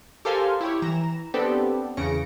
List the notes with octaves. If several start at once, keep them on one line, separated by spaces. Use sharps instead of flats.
G4 A4 A#4 C5 F5 G#5
E4 G4 C#5
E3 A#5 E7
B3 C4 D4 G4 A4 B4
E2 C#3 A#6 C#7 D7